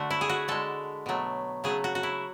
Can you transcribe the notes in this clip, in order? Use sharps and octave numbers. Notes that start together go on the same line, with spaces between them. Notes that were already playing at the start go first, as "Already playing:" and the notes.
Already playing: D3 A3 F#4
E4
G#4
F#4
D3 G#3 A4
B2 F#3 A3
C#3 F#3 A3 G#4
F#4
F#4
E4